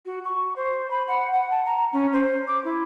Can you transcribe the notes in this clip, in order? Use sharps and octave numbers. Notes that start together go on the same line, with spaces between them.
F#4
C#6
C5
B5
F#5
F#5
A5
A#5
C#4
C5
D6
E4